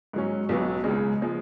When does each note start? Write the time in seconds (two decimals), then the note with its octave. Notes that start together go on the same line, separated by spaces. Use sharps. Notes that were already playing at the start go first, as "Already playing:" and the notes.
0.13 G#2 F#3 C#4
0.49 B1 B2 F#3 B3
0.84 C#2 C#3 G#3
1.22 F3 G#3